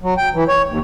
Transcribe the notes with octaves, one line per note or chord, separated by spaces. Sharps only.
F#3
G5
E3
C#5
D#2